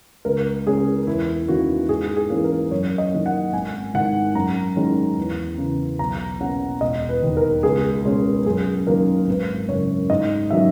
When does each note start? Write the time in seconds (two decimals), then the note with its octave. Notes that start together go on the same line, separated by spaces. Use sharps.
0.25 C#2 A#4
0.66 C#3 G#3 C#4 G#4
1.07 E2 E4
1.48 D#3 A#3 C#4 F#4
1.89 G#2 G#4
2.16 G#4
2.30 E3 A#3 C#4
2.44 A#4
2.71 F#2 C#5
2.98 D#5
3.12 D#3 A#3 C#4
3.26 F#5
3.53 G#1 G#5
3.94 G#2 D#3 F#5
4.35 F#2 A#5
4.76 D#3 G#3 C#4
5.17 E2
5.58 C#3 E3
5.99 B1 A#5
6.40 B2 A#3 C#4 F#5
6.81 E1 D#5
7.09 B4
7.22 D#2 D#3
7.37 A#4
7.63 C#2 G#4
8.05 B2 G#3 C#4
8.46 F#2 G#4
8.87 D#3 F#3 A#3 C#4 A#4
9.27 G#1 B4
9.69 F#2 C#3 C#5
10.10 G#2 D#5
10.50 D#3 F#3 C#4 E5